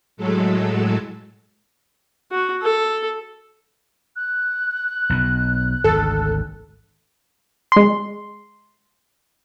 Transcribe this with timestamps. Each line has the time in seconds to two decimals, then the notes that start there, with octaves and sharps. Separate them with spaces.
0.17 A2 F#3 G#3 A3 A4
2.32 F#4
2.63 A4
4.16 F#6
5.10 B1 B2
5.84 G#1 D2 A4
7.72 G#3 C6